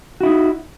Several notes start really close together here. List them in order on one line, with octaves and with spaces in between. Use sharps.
F#4 E4 D#4